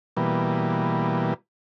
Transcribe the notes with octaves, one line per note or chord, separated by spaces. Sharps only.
B2 E3 G3 A#3